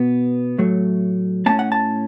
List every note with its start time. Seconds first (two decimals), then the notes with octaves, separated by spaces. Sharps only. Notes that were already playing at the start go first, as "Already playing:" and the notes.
Already playing: B2 B3
0.58 A2 F#3 A3
1.46 A2 A3 C#4 A5
1.59 F#5
1.72 A5